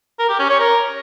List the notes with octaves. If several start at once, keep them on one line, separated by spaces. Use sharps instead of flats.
A#4
G4
C#4
C#5
A#4